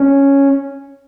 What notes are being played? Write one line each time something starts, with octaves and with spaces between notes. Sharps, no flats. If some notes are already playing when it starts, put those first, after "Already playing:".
Already playing: C#4